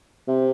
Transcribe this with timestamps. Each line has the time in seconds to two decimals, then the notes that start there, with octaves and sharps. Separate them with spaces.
0.28 C3